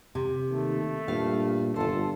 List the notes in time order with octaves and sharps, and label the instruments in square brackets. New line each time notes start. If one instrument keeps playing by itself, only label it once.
[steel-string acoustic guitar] C3
[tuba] D#2 [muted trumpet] A3
[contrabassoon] G2 [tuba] A#2 [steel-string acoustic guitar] F5
[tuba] G1 [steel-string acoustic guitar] F4 C5 [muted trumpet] A4